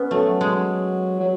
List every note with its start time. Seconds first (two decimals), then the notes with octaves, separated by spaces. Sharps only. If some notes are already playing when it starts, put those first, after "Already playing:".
Already playing: B3 C#4
0.11 F#3 A3
0.41 G#3
1.20 F#3